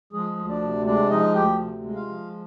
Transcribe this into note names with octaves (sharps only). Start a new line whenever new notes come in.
F3 G#3 G#4
D2
D4 D5
C3
G#3 D4 D5
F3 D#4 D#5
D2 G4 G5
C3
G#3
F4 F5
F3